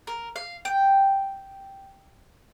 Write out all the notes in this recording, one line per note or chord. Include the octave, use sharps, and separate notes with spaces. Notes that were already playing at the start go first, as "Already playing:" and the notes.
A#4
F5
G5